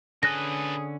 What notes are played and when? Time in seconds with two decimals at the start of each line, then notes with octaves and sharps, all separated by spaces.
0.23 D3 C#4 G#4 A4 B4 F#6 A#6